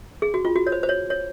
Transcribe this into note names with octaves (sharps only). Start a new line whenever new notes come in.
G#4
F#4
F4
F#4
C#5
C5
C5
C#5
C#5